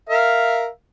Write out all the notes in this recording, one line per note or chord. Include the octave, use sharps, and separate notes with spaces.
A#4 E5 F5